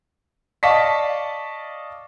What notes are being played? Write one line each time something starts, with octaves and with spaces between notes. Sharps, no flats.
D5 D#5 F5 A5 C#6 B6